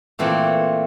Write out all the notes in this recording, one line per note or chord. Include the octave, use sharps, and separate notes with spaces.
A#2 E3 A3 C4